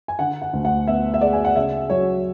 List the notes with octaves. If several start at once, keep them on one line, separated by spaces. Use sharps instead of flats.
G#5
D3 F#5
F#5
D2
F#5
B3 E5
E5
G#3 D5
G#5
F#5
C#3 E5
F#3 C#5